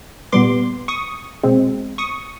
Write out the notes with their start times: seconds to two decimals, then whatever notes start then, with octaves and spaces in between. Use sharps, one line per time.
0.32 A#2 G3 B3 C6 D6
0.88 C#6 D#6
1.43 B2 G#3 C4
1.98 C#6 D#6